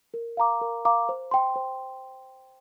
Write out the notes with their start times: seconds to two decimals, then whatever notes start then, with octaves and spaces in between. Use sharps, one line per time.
0.14 A#4
0.37 F5 A#5 D6
0.61 A#4
0.85 F5 A#5 D6
1.09 C5
1.31 G5 C6
1.56 C5